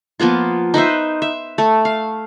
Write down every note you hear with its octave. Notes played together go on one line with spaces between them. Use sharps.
F3 A#3 B3 F4
D#4 B4 C5 E5
E5
A3
F5